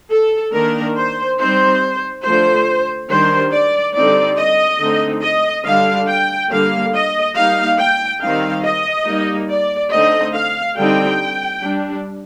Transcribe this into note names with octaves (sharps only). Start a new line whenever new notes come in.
A4
D#3 A#3 D4 A#4
C5
G3 C4 D#4 C5
D3 F3 A3 C5
D#3 G3 D4 C5
D5
D3 G3 C4 D#4 D5
D#5
D3 A3 C4 D#4
D#5
D3 G3 D4 F5
G5
D3 G3 A#3 F5
D#5
G3 A#3 D#4 F5
G5
D#3 G3 C4 D#4 F5
D#5
G3 A#3 D#4
D5
D3 A3 C4 D#4 D#5
F5
D3 G3 C4 D#4 G5
G3 D4